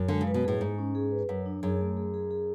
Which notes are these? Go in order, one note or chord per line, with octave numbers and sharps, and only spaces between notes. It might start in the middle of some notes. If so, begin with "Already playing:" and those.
Already playing: F#2
D3 G#3
C#3
B4
B2
A2 G#4
G#2 G#3
C#4
G#4
B4
F#2 F#3
D4
F#2 G#4
A3
G#4
G#4
G#4